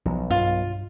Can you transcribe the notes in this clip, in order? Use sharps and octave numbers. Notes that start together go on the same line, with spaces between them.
B1 F3
G2 F4